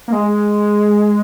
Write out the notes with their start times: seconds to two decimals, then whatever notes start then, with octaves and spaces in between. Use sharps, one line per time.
0.08 A#3
0.13 G#3